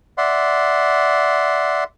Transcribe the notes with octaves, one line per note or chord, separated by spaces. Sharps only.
D5 E5 F#5 C6